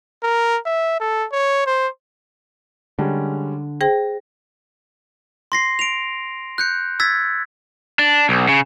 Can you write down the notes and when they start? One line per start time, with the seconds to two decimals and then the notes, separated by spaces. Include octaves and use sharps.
0.23 A#4
0.66 E5
1.00 A4
1.32 C#5
1.66 C5
2.99 D3 G3 G#3 C#4
3.81 G#4 C5 G5 A#6
5.52 C6 A#6 C7
5.79 D7 F7
6.58 F#6 G6 C#7
7.00 E6 G#6 A6 B6
7.99 D4
8.29 B1
8.49 C#3